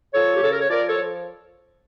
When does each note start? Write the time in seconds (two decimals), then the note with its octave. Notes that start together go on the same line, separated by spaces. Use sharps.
0.14 F3 A4 C#5
0.34 G4
0.42 C#3 A4
0.52 A#4
0.61 C#5
0.69 F3 A#4 D5
0.88 A4 C#5
0.98 F3